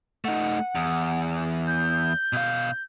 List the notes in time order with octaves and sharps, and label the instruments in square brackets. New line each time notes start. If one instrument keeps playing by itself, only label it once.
[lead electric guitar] A3 D#4 [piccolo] F#5
[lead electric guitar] E2
[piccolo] G6
[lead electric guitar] B2 F5